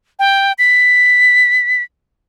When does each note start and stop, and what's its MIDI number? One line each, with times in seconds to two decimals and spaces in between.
0.19 0.53 79
0.58 1.82 95